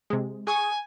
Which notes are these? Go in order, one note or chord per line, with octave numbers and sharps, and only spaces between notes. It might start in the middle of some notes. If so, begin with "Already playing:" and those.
C3 G#3
G#4 G#5 C#6 D#6